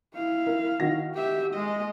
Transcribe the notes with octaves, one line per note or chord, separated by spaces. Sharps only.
E4 F5
A#4
D#3 F#4 A#6
G4 E5
G#3 D#5